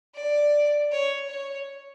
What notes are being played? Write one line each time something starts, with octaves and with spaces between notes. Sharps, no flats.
D5
C#5
C#5